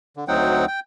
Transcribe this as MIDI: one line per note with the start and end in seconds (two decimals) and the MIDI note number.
0.17 0.24 50
0.28 0.65 38
0.28 0.65 54
0.28 0.65 60
0.28 0.65 63
0.28 0.65 78
0.28 0.65 79
0.68 0.80 79